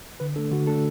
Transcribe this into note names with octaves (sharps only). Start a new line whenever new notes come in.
D3 B4
A3 D4 A4
D3 F#4
A3 D4 A4